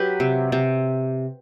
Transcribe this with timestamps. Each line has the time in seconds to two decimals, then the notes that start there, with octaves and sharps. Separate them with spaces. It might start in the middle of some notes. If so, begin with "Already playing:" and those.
Already playing: F#3 G4 B4
0.20 C3
0.52 C3